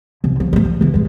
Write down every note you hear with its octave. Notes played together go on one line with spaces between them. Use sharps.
C2
F3
G#3 A3
F3
C#2 E3
A#2 G#3